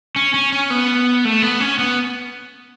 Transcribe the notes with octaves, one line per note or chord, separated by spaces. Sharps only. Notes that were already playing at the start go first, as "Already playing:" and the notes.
C#4
C#4
C#4
B3
A3
B3
C#4
B3